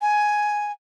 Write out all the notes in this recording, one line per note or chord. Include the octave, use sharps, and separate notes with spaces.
G#5